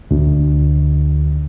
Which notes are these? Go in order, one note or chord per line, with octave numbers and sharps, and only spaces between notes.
D2